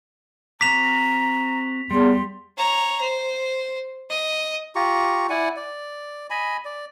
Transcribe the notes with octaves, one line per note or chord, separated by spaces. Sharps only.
C4 F#4 A#5 D6 B6 F7
E2 G3 C6
C#5 A#5
C5
D#5
F4 G4 A#5 C#6
E4 D5 F#5 G#5
D5
D#5 G#5 B5
D5